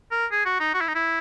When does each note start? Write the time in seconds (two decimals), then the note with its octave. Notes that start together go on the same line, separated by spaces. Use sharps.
0.11 A#4
0.31 G#4
0.45 F#4
0.60 D#4
0.74 F#4
0.81 E4
0.88 D#4
0.95 E4